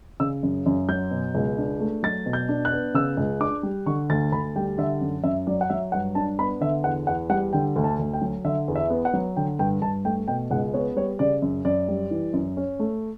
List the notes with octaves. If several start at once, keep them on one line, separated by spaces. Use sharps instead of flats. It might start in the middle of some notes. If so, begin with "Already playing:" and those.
C#3 E6
F#2
F#2
F#3 G6
B2
C#2
D4
A3
F#3 A6
B2
G6
D4
F#6
B3
C#3 E6
C#2
D4 D6
G3
D3 C#6
D2 A6
D2 B5
G3 G5
D3 E5
F#2
F#2 E5
F#3 D5
F#5
F#3 E5
G2 F#5
D4 A5
B3 B5
D3 E5
E2 F#5
E2 F#5
G3 F#5
D3 G5
D2
A5
D2
G5
F#3
D3 E5
E2
E5
B3
F#5
F#3
D3 G5
G2 G5
G2 A5
A3 G5
B2 G5
C#2 F#5
B3 C#5
G3 C#5
C#3 D5
F#2
F#2 D5
G3
E3
F#2
C#4
A3